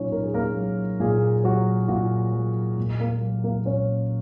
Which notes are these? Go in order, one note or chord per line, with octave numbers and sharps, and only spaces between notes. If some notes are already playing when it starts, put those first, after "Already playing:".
Already playing: A#2 F#3 C#4 D#4 F4 C#5
A#2 A#4
G#4
A#3 A#4
F#3
A#2 G#4
F#3 F#4
A#2 F#4
F#3
A#2
A#3 A#4
F#3
A#3 A#4
A#2 C#4 C#5